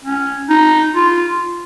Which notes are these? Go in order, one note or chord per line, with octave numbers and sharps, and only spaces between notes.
C#4
D#4
F4